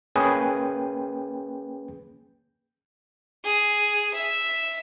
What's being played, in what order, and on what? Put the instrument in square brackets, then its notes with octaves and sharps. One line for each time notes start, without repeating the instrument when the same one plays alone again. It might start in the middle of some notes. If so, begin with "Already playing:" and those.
[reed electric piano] A#3 C#4 G#4 B4 G5
[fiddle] G#4
E5